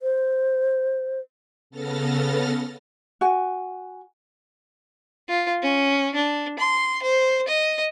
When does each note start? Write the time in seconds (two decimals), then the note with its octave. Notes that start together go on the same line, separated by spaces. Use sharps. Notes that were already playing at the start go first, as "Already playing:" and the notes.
0.02 C5
1.70 C#3 B3 A4 F6 A6 A#6
3.21 F#4 G#5
5.29 F4
5.63 C#4
6.14 D4
6.59 C6
7.03 C5
7.48 D#5